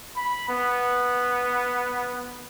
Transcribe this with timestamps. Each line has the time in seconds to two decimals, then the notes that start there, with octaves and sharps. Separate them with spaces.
0.16 B5
0.49 B3